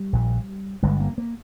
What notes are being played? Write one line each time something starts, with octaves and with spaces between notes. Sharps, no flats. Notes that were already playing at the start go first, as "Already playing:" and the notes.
Already playing: G3
A#1 A#2
G1 G2 D3 G#3
A#3
A#3